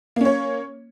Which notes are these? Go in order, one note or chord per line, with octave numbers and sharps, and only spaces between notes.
A#3 C#4 C#5